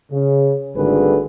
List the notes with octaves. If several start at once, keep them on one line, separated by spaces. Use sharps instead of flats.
C#3
G#1 D3 G3 A3 G#4 B4